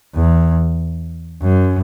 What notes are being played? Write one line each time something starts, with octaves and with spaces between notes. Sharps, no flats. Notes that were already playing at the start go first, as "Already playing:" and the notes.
E2
F#2